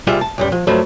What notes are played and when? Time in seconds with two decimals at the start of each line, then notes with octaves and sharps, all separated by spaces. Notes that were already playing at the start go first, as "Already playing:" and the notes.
0.07 C2 G3 F4 G#4 E5
0.21 A5
0.38 B1 F#2 G3
0.52 F3
0.67 G2 F3 F#3 A3 B5